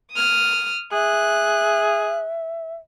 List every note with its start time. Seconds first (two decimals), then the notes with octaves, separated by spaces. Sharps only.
0.12 D#6 F6
0.93 G#4 E5 F#6